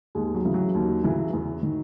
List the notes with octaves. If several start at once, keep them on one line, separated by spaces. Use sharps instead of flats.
D#2 G#3
F#3
C#3 E3
F#3
D#2
C#3 E3
E2
D#3